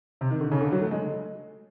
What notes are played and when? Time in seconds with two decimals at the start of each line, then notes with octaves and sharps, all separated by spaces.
0.21 C3
0.31 D#3
0.41 D3
0.52 C#3
0.61 D3
0.72 F#3
0.82 A3
0.91 G#3